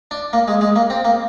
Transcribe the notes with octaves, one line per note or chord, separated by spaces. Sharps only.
D4
A#3
G#3
G#3
A#3
C4
A#3